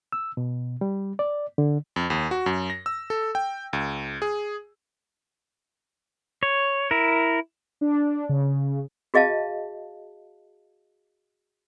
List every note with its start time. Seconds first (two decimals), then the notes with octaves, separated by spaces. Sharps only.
0.12 E6
0.37 B2
0.81 G3
1.19 D5
1.58 D3
1.96 F2
2.10 D#2
2.31 F#4
2.46 F#2
2.70 A#6
2.86 E6
3.10 A4
3.35 G5
3.73 C#2
4.22 G#4
6.43 C#5
6.91 E4 A#4
7.81 D4
8.29 C#3
9.14 F#4 G#4 D#5 F5 A5